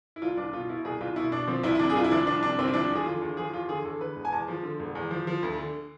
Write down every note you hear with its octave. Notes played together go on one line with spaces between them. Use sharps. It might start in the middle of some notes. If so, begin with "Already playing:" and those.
E4
C2 F4
C2 D4
B2 F4
B2 E4
C2 G#4
C2 F4
B2 E4
B2 D4
F3 C4
C2 E4
E4
C3 D4
G#4
C2 F4
E4
F3 D4
C2 D4
C3 D4
C2 C4
E4
F3 D4
E2
G#4
D3 F4
E2
F3 G#4
E2 F4
D3 G#4
E2 A4
D3 B4
E1
G#5
E2 A5
F3
D3
E1
E2
F3
F3
D2
D3